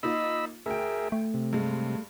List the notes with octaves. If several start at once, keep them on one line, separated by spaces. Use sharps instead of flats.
A#3 D#4 F4 D#5 B5 E6
D2 G#4 A#4 E5 G5
A3
C3
G2 G#3